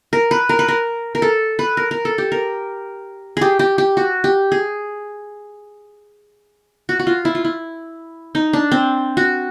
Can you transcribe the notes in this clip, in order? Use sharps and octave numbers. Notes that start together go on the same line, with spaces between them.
A#4
B4
A#4
B4
A#4
A#4
A4
B4
A#4
A#4
A4
G4
A#4
G4 G#4
G4
G4
F#4
G4
G#4
F#4
F#4
F4
E4
F4
E4
D#4
D4
C4
F#4